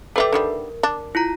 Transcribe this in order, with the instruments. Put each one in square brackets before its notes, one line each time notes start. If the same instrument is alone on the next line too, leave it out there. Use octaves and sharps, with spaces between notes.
[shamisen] G3 E4 G4 [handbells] A4 B4 E5
[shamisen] D3 D#3 G3 [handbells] A#4
[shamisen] D4
[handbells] E4 F4 A#5